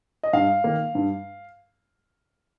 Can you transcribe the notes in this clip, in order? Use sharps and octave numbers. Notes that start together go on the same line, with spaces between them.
D#5
G2 F5
D#3 A#3
G2